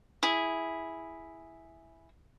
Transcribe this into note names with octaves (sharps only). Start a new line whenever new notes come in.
E4 G#4